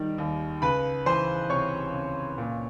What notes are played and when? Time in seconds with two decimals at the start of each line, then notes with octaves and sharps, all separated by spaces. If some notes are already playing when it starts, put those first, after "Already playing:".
Already playing: D#3 G3
0.18 D#2
0.62 C#2 B4 B5
1.06 E3 C5 C6
1.50 C3 C#5 C#6
1.94 C#2
2.38 A#2